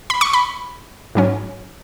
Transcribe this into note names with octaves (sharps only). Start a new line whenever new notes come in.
B5
C#6
B5
G#2 F#3 C#4